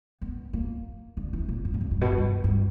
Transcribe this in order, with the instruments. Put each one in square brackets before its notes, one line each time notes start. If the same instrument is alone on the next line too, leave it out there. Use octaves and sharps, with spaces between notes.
[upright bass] B3
A#3
D3
E3
A#2
G2
A#2
G2
G2
B2
G2
G2